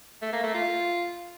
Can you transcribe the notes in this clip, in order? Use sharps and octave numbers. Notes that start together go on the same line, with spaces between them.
A3
A#3
A3
F4